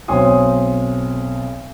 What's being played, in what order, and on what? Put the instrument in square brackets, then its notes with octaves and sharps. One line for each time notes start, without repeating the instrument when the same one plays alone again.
[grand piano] B1 C4 C#5 G#5 C6 D#6